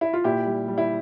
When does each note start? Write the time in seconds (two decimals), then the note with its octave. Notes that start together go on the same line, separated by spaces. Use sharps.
0.01 E4
0.13 F4
0.24 A#2 E4 G4
0.46 G3
0.68 G3
0.78 E4